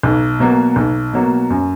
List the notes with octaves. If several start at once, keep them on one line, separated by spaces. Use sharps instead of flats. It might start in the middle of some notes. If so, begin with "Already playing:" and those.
B1
B2 F#3 A#3
B1
B2 F#3 A#3
F#2